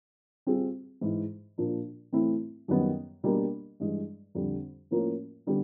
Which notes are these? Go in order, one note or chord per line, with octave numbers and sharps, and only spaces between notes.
G3 C4 F4 G#4
G#2 E3 G#3
A#2 F3 A#3 D4
A2 E3 A3 C4 E4
F#2 D#3 G3 B3
B2 G3 A#3 D4
G2 E3 G#3
F2 D3 G3
A2 F3 A#3 C#4 F4
D3 G3 B3